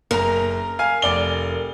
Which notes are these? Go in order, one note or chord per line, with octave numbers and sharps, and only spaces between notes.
F#1 A#4 A#5
F5 G#5 F6
F1 D5 G7